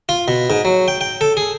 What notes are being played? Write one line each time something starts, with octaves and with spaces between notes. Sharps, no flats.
F4
B2
G#2
F#3
G5
G5
A4
G#4